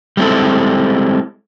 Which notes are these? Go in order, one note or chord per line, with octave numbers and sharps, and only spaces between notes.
G3 G#3 C4 E4 A4